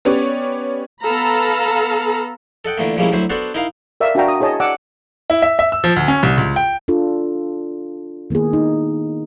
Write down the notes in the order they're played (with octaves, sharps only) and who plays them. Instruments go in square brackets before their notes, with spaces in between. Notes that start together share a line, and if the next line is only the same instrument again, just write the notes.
[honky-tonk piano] B3 C#4 G4 B4 C#5 D5
[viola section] B3 A4 F5 A#5 B5
[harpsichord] A4 D#5 F#5 G5
A#2 D3 E3 A3 A#3
F3 G3 G#3 A#3 C#4 E4
D2 F#3 E4 C5
B3 D4 F#4 A4 C5
D#4 E4 A#4 D#5 F5
[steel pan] A#4 D5 E5 F5
D4 F#4 E5 F5 G5 A#5
D#6
E4 G#4 C#5 D#5 A5
D5 F#5 D6 E6
[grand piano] E4
E5
E5
E6
F3
D2
C#4
C2
C#2
G5
[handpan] D4 F4 A4
D#3 A#3 B3 E4 G#4
D#4